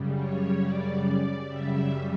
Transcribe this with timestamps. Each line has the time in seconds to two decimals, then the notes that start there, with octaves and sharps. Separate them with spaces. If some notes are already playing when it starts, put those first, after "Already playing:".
Already playing: F#2 C#3 G3
0.16 C#5
0.59 D5
1.03 D5
1.46 F#2 C#3 G3 E5